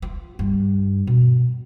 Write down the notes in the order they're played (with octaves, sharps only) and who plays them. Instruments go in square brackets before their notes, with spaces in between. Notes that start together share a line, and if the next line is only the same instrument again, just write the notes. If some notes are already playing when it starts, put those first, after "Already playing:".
[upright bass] F4
G2
B2